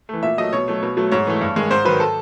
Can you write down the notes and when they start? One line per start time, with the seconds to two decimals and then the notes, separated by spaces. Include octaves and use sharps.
0.09 E3 A3
0.23 A#2 E5
0.38 F#3 A3 D#5
0.53 B2 C#5
0.68 F#3 A3
0.83 B2
0.97 F#3 A3
1.12 G#2 C#5
1.27 E3 A3
1.41 G2
1.56 D#3 G#3
1.71 G#2 C5
1.85 D#3 F#3 B4
2.00 A4